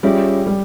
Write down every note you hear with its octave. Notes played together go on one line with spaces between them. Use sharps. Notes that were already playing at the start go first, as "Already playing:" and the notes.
G3 C#4 F4 G#4 C#5 E5
G3